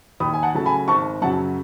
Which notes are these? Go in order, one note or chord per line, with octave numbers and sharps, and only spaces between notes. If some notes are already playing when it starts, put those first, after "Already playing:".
D#2 B5 D#6
G#5
F#5 A5
C#3 F#3 A3 A5
G#5 B5
G#1 A5 C#6
F#2 C#3 F#3 F#5 A5